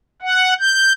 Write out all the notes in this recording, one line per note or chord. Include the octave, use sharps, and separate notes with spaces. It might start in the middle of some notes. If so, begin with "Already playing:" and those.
F#5
G6